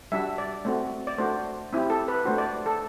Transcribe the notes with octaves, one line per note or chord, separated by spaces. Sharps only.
G3 D4 F#4 E5
D5
A3 C4 F#4
D5
A3 D4 F#4 C5
C4 E4 G4
A4
B4
A3 D4 F#4 C5
D5
A4